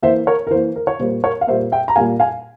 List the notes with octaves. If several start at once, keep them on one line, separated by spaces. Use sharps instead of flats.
E3 A#3 C5 E5
A#4 C#5
A#4
E3 A#3 C5
A#4
C#5
A#2 G3 A#3 C5
A#4 C#5
F5
A#2 G3 A#3 C5 E5
E5 G5
A#5
A#2 G3 A#3 F5 G#5
F5 G#5